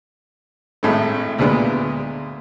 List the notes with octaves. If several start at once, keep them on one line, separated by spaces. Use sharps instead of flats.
G#1 A2 G#3 A3
D2 A#2 G#3 B3